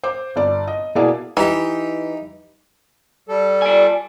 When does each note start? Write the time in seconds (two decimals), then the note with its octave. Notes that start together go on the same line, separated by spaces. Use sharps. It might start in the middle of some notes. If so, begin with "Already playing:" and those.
0.03 C5 D6
0.36 G1 D5
0.67 D#5
0.95 B2 A#3 E4 G#4 D5
1.37 E3 D#4 G4
3.29 G3 A4
3.62 D5 G#5